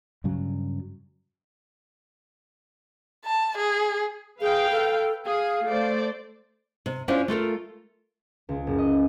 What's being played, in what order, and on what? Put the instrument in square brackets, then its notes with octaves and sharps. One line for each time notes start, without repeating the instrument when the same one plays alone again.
[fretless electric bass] G2 C#3 F#3
[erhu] A5
G#4
[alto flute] G#4 [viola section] B4 F5 G5
[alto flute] A4
[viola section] G#4 [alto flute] F5
[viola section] A3 C5 D5
[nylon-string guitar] C3
C#4 D4 E4 F4 C5 C#5
A3 F4 A4 A#4
[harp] C#2
F#1
D#5